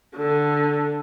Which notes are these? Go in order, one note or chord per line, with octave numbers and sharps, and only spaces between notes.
D3